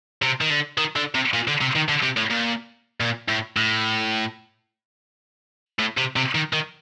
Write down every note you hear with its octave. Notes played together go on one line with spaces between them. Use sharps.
C3
D#3
D3
D#3
D3
C3
A#2
D3
C3
D#3
D3
C3
A2
A#2
A#2
A2
A2
A2
C3
C3
D#3
D#3